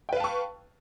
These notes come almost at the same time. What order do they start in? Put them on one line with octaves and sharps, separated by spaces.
G5 B4 F5 A5 C#6